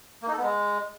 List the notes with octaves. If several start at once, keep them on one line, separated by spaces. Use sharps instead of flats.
A#3
D#4
A4
B3
G#3